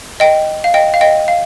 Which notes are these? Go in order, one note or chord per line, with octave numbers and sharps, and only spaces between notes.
D#5 G5
F5
D#5 G5
F5
D#5 G5
F5